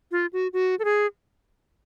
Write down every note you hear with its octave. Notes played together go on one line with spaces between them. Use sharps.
F4
F#4
F#4
A4
G#4